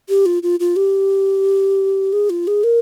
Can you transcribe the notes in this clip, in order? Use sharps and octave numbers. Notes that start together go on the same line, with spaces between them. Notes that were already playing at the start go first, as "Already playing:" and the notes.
G4
F4
F4
F4
G4
G#4
F4
G#4
A#4